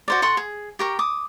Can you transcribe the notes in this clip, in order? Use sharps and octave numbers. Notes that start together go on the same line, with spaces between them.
F#4 C5 D5
A4 F#5 C6 C#6
G#4
G4 A#4 C#6
D6 D#6